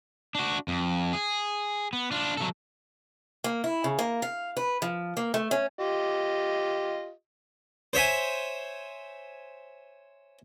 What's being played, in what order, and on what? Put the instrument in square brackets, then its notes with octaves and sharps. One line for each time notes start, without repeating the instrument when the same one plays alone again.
[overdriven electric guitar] D4 F#4
F2
G#4
B3
D4 F4
F#3 A4
[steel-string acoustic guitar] A#3
E4
C#3
A#3
F5
B4
F3
A#3
A3
C#4
[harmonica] F4 G4 D#5
[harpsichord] C5 C#5 E5 G#5